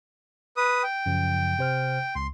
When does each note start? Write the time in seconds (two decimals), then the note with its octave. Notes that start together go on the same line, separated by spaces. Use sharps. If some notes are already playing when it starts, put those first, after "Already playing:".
0.57 B4 D#6
0.83 G5
1.06 F#2 C#3 F3
1.59 C3 C5 F6
2.15 C#2 C6